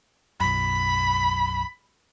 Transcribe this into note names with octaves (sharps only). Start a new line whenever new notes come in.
B1 F#2 B5